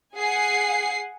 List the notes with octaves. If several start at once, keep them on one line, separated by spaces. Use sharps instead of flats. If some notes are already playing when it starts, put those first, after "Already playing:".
G#4 F#5 G#5 C7